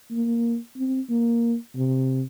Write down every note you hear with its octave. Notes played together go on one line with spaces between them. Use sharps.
A#3
C4
A#3
C3